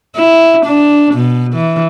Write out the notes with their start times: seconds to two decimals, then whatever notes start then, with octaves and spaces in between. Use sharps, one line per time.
0.16 E4
0.66 D4
1.15 B2
1.53 E3